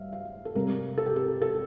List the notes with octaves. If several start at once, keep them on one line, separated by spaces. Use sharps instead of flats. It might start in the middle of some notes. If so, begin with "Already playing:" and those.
Already playing: G2 E5 F5
F5
A4
C3 G3 C4 A#4
A4
G4
A4
A4